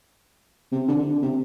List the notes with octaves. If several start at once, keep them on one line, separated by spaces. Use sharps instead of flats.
C3
D3
C3